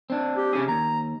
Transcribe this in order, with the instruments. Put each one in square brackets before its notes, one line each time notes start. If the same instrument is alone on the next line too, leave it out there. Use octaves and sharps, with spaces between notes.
[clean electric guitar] C4 D4
[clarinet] G4
[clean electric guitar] C3 C#4 G#4
[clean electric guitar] D#2 [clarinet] A#5